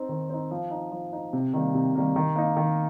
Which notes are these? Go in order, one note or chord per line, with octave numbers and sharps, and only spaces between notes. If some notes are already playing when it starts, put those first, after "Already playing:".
Already playing: C4 D#4
D#3
C4 D#4
F3
D#4
F3
D#4
C3
D#3 G3 A#3
C3
D#3 G3 A#3
D#3
A#3 D#4
D#3